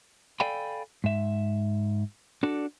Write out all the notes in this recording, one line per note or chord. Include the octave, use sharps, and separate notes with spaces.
A4 D5 F5 G5 G#5 B5
G#2 E5
D4 F#4 A4 D5